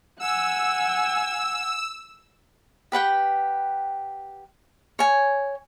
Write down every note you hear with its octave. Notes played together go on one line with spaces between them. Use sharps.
F#5 G#5 E6
G4 B4 F#5 G5
C#5 G#5